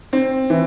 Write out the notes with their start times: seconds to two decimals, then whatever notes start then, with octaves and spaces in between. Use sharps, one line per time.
0.13 C4
0.50 E3